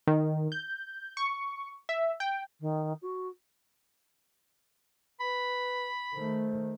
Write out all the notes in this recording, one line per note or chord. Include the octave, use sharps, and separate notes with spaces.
D#3
G6
C#6
E5
G5
D#3
F#4
B4 B5
D#3 A3 C5